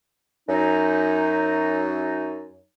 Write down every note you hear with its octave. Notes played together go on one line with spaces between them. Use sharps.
F#2 D#4